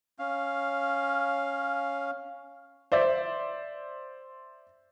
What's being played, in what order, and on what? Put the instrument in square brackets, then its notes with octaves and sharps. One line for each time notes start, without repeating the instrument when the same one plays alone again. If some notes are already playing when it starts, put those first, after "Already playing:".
[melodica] C#4 F5
[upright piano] C5 D5 E5